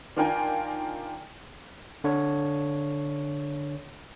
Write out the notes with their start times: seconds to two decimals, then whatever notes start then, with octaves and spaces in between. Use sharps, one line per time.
0.16 D#3 D4 F4 A#4 G5 G#5
2.04 D3 D4 C#5